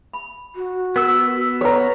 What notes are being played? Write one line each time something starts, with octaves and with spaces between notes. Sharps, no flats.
B5
F#4
B3 A#4 E6
A4 B4 C#5 A#5